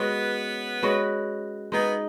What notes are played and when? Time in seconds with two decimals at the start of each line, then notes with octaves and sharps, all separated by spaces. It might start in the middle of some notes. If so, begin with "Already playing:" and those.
Already playing: G#3 B3 C#4 F#4 B4
0.83 G#3 C#4 F#4 B4
1.72 G#3 B3 D#4 G#4